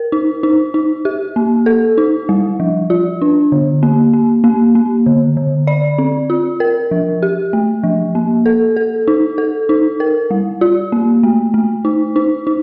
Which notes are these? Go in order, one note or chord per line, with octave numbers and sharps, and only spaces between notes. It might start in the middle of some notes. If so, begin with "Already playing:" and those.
Already playing: A#4
D#4
D#4
D#4
G4
A#3
A4
D#4
G3
F3
F4
D4
D3
A#3
A#3
A#3
A#3
D3
D3
D5
C4
F4
A#4
F3
G4
A3
F3
A#3
A4
A4
D#4
A4
D#4
A#4
G3
F4
A#3
A3
A3
D#4
D#4
D#4